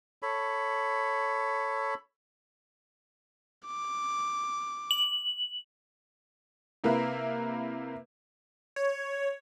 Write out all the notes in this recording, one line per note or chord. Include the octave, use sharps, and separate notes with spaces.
A4 C#5 B5
D6
F#7
C3 A#3 E4 A#4 B4
C#5